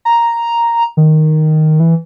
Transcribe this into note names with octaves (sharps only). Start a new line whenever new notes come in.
A#5
D#3
E3